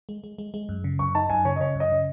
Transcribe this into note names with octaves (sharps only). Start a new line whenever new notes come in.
G#3
G#3
G#3
G#3
F#2
C#3
F#2 C#6
D#4 A5
F#2 G#5
C#3 C#5
D#5
C#3 C#5
F#2
D#5
C#3